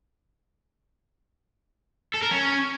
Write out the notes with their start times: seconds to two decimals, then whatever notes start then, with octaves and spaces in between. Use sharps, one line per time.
2.15 A4
2.23 A#4
2.31 C#4